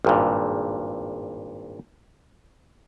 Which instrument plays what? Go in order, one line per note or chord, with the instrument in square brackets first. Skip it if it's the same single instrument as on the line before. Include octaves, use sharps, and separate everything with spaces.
[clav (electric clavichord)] G#1 G2 A#2